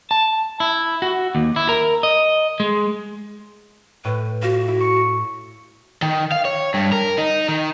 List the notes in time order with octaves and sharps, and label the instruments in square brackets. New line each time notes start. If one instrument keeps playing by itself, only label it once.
[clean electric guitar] A5
E4
F#4
D#2
E4
A#4
D#5
G#3
[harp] A2 [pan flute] B4
[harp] F4 [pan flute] F#4
[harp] E4
C#6 C#7
[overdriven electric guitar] D#3
F5
C#5
G2
A#4
D#4
D#3